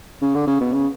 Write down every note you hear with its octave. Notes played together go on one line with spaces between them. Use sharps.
C#3
D3
C#3
B2
C#3